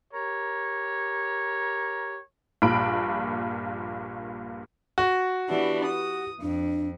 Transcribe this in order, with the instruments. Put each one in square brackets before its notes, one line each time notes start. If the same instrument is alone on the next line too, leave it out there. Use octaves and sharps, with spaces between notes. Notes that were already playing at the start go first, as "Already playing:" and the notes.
[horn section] G4 A#4 C#5
[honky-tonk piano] A#1 G2 A#2 B5 D7
[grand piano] F#4
[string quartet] E3 B3 D4 [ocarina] G4
[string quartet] D#6
[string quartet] F2 [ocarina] D4